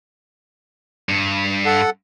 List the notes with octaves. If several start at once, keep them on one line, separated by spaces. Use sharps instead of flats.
G2
A4 F#5